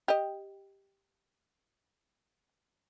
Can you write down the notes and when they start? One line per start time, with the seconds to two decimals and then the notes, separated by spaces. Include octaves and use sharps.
0.08 G4 D#5